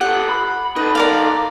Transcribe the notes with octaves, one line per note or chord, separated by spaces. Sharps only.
G4 A4 F#5
B5
D#4 A4 B4
A#4 D5 F5